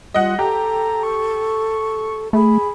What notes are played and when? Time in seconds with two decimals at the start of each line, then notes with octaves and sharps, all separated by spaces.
0.14 G3 F4 D#5 F#5
0.39 G4 A4 A#5
1.03 C#6
2.33 A3 G#4 B5